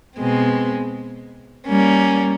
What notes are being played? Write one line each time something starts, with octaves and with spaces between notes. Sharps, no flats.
B2 G#3 C4
G3 A#3 C#4